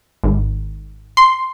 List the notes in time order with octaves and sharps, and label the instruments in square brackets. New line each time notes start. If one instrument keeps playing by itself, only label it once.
[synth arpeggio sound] G#1
C6